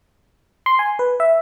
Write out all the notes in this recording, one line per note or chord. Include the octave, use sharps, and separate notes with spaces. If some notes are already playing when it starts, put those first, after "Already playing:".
C6
G#5
B4
E5